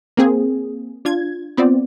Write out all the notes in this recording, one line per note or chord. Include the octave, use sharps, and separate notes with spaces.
A#3 C4 G#4
D4 F4 G#6
B3 C4 F4 D5